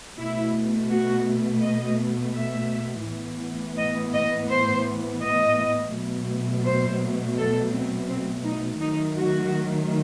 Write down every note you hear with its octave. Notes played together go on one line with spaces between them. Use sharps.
B2 A3 E4
F#4
D#5
E5
A2 E3 B3
D#5
D#5
C5
D#5
B2 F#3 A3
C5
A4
C4
C4
D#4
D#3 F#3 A3 D#4
F#4